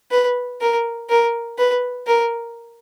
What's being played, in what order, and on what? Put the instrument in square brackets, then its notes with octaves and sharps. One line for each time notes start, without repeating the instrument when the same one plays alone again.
[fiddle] B4
A#4
A#4
B4
A#4